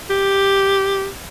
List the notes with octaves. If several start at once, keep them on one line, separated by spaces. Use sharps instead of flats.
G4